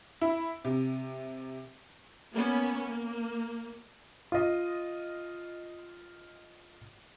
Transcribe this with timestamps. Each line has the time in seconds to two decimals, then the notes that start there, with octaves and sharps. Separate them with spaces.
0.21 E4
0.65 C3
2.32 A#3 B3 C#4
2.86 A#3
4.32 F4 D#5